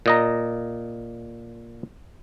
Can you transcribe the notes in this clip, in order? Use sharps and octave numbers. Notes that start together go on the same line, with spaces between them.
A#2 D#5 A#5